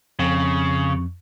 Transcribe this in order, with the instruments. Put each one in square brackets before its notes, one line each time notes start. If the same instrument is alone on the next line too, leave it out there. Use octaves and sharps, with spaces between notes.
[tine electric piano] F2 [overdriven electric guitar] C#3